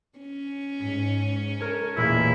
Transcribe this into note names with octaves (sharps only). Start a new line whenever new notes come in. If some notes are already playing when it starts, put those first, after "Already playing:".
C#4
G#2 B6
A#4 C#5 A5
E1 A#2 A3 A#3 E4